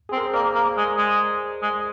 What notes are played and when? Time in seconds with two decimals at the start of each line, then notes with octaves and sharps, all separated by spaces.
0.09 G#4
0.12 C4
0.17 A#4
0.26 C5
0.34 A#3 A#4 D5
0.55 A#3
0.77 G#3
0.98 G#3
1.62 G#3